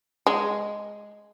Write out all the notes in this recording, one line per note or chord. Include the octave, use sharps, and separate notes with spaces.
G#3